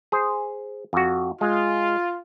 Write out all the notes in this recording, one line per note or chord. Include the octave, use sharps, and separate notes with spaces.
G#4 C5
F2 F#4
G#3 F4